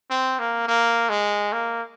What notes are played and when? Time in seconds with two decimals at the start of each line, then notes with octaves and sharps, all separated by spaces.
0.10 C4
0.39 A#3
0.67 A#3
1.09 G#3
1.53 A#3